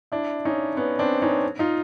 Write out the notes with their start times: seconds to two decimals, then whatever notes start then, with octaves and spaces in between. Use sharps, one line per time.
0.12 D4 E4
0.45 C#4 D#4
0.77 B3 C#4
0.99 C4 D4
1.22 C#4 D#4
1.59 D#4 F4